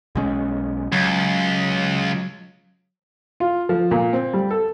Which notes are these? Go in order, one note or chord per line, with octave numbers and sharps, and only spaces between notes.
B1 G#3 C#4
C#2 F#3
F4
F3
A#2
C4
G3
A4